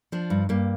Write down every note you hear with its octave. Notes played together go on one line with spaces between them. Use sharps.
F3 D4
G2
G2 A#3